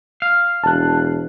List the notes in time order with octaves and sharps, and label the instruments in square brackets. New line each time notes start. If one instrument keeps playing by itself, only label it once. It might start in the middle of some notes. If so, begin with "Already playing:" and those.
[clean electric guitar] F5
[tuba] E1 [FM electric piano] A5 F#6